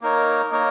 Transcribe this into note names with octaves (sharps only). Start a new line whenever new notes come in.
A#3 D#4 A#4 C#5
A#3 D#4 A#4 C#5